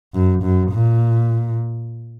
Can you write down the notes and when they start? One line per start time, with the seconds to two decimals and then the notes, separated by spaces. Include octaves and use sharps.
0.14 F#2
0.43 F#2
0.71 A#2